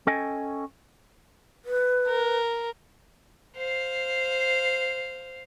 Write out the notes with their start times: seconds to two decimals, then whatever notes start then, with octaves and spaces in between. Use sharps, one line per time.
0.07 C#4 A4 D#5 G5 G#5
1.65 B4
2.07 A#4
3.56 C5 F5